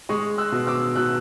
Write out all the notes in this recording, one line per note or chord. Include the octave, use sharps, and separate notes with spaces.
G#3 C#6 D#6
E6 F#6
B2
D6 E6
B2 E6 F#6